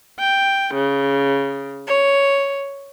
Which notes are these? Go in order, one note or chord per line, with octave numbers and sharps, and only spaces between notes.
G5
C#3
C#5